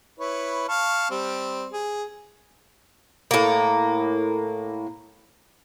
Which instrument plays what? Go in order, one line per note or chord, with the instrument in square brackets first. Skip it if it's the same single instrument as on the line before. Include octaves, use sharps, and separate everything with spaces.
[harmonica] E4 B4 C#5
F5 A5 C#6
G3 C4
G#4
[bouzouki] A2 A#3